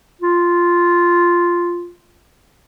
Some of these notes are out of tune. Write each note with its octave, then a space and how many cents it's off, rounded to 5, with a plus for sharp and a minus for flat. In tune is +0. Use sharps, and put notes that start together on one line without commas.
F4 -5